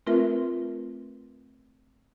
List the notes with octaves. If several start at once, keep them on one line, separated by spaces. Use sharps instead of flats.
A3 C4 F4 A#4 B4 E5